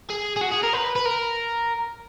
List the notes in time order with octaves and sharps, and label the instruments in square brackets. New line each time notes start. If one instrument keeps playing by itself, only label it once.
[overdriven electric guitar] G#4
G#4
F#4
G#4
A#4
B4
B4
A#4